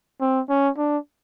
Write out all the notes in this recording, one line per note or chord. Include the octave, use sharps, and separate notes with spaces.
C4
C#4
D4